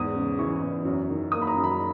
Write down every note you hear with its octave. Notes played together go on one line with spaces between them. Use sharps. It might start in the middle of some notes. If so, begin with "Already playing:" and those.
Already playing: E2 G#2 D#6
C#3
E3 C#6
E2
F#2
D#3
A#3 D#6
B5
A#5
F#2
B5